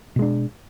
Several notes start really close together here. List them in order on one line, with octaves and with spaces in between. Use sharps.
B2 G#3 D4